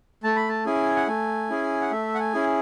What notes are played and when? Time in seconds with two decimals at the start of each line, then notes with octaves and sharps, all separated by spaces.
0.24 A3 A5
0.36 B5
0.49 A5
0.66 C#4 E4 G#4 G#5
0.96 F#5
1.07 A3 G#5
1.50 C#4 E4 G#4
1.81 F#5
1.91 A3 E5
2.15 F#5
2.20 G#5
2.34 C#4 E4 G#4